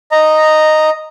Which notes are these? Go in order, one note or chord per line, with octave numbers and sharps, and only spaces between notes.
D#5 A#5